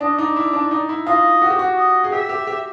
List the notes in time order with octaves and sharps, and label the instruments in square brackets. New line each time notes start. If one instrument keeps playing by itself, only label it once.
[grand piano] D4 [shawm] D#5
[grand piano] D#4 [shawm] D5
[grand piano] E4
D4
D#4
E4
[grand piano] F4 [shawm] D#5
[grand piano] F#4
G4
F#4
[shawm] D#5
[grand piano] G#4
[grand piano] G4 [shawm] E5
[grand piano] G4
G4